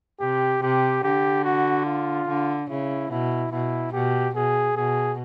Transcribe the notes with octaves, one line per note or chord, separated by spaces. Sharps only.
C3 G4
C3 G4
D3 G4
F#4
F4
D3
C#3 E4
B2 E4
B2 E4
B2 G4
B2 G#4
B2 G#4